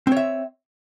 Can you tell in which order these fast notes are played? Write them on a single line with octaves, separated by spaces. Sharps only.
C4 C#5 E5